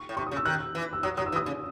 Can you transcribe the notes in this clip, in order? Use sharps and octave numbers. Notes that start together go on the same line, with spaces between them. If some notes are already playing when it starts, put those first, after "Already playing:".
Already playing: C#6
A2
C3 C#6
C#3 D#6
E6
D#3 F#6
E6
E3
E6
F#3 D#6
F#3 D#6
E6
E3
D#6
C#3